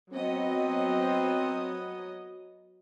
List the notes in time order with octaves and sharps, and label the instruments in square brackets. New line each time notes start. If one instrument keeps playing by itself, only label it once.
[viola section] F#3 B3 D#5 [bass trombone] C4